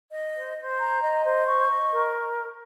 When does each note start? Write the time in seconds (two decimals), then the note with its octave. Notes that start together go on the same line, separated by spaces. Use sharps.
0.12 D#5
0.35 C5
0.58 C5
0.79 A#5
1.02 D#5
1.24 C5
1.47 C#6
1.69 D#5
1.91 A#4